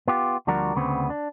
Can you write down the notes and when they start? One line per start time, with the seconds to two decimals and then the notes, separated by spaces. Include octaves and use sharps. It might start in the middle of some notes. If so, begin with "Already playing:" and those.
0.08 B3 F4 G4
0.47 D2 F3 G3 D4 F#4 A#4
0.76 D2 C#3 B3 C4
1.10 D4